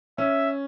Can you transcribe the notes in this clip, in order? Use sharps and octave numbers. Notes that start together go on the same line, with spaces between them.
C#4 E5